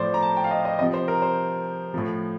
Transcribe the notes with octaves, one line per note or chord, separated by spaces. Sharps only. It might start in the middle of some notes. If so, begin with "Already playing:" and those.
Already playing: A2 F3 C5 D5
A#5
A5
G5
F5
D#5
D#5
C3 F3 D#5
C5
A#4
C5
A2 F3